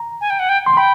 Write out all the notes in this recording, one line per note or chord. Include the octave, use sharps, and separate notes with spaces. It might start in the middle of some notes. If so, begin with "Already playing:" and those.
Already playing: A#5
G#5
G5
F#5
G5
C6
G5 B5